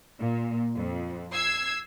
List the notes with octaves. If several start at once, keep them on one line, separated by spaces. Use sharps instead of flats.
A#2
F2
E6 G#6 C7